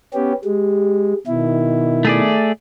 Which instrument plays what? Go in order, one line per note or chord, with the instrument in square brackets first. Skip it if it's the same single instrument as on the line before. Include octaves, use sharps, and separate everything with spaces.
[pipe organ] B3 C#4 G4
[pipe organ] G#3 [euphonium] G4
[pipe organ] B2 E4 [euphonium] D#3
[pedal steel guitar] A3 G#4 D5